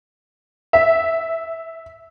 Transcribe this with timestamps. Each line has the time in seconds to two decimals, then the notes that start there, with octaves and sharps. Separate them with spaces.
0.73 E5